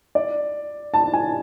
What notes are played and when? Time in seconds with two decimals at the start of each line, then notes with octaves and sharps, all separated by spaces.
0.15 D5
0.94 A5
1.13 G#5